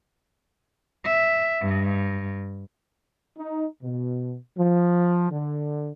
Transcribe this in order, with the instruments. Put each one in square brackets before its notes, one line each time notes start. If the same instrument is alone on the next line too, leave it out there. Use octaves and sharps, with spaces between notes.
[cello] E5
G2
[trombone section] D#4
B2
F3
D3